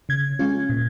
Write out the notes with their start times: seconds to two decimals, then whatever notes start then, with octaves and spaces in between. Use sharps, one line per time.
0.09 C#3 G#6
0.39 G#3 C#4 F4
0.69 A#2